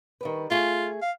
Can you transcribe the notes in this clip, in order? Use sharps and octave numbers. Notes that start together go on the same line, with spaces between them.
D#3 G3 B4
A3 F4 G#4 G#5
F5